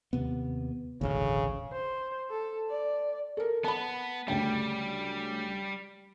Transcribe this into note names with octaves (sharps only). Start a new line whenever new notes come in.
D#2 C3 B3
E1 A1 D2 C#3
C5
A4
D5
A4 A#4
B3 A5 B5
D2 C#3 G3 G5